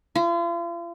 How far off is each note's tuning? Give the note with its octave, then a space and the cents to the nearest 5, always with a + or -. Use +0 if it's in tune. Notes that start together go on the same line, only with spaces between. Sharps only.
F4 -40